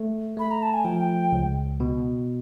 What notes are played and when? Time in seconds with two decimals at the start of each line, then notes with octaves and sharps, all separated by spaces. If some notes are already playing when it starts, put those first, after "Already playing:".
Already playing: A3
0.37 A3 B5
0.51 A#5
0.63 A5
0.73 G#5
0.85 F3 G5
1.32 C#2
1.80 B2